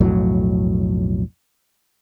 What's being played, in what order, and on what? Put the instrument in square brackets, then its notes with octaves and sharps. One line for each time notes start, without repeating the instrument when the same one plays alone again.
[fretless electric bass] B1 F2 A2 F#3